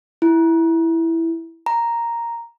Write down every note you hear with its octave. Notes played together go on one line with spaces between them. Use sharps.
E4
A#5